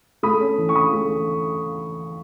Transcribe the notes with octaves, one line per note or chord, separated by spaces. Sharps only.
A3 B5 D#6
C#4
E3
C#6
E3 B5 D#6
A3